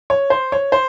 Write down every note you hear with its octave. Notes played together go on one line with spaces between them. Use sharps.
C#5
C5
C#5
C5